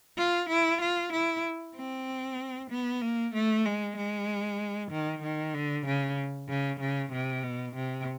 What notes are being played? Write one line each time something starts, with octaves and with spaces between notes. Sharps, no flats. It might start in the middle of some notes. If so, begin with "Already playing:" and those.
F4
E4
F4
E4
C4
B3
A#3
A3
G#3
G#3
D#3
D#3
D3
C#3
C#3
C#3
C3
B2
C3